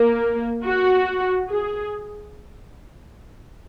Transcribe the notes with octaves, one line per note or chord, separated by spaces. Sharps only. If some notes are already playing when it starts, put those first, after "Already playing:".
Already playing: A#3
F#4
G#4